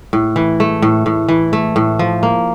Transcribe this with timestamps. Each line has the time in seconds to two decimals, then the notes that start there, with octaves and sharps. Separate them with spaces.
0.13 A2
0.36 E3
0.60 A3
0.82 A2
1.06 A2
1.29 E3
1.53 A3
1.76 A2
1.99 F3
2.23 A#3